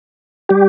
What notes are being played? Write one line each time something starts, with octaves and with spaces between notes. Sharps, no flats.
G3 G4